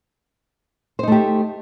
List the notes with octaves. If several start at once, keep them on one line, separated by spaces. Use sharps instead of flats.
A3 D#4 G4 C5